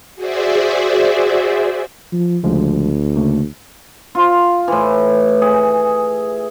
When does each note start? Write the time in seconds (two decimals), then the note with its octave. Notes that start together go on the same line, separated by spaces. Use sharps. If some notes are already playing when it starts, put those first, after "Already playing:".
0.15 F#4 G#4 C5 D5 E5
2.12 F3
2.44 D2 C#3 F3 G#3
3.16 C#3 A3 A#3
4.15 F4
4.68 A2 E3
5.42 G#4